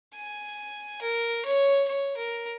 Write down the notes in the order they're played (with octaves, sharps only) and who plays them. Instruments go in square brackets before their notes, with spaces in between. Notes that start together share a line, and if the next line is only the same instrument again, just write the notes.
[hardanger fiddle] G#5
A#4
C#5
C#5
A#4